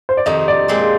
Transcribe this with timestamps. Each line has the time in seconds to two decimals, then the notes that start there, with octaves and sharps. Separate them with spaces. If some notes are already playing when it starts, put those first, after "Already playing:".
0.09 C5
0.17 D5
0.26 F2 C3 D#3 D#5
0.48 D5
0.68 A#2 G#3 C4 G4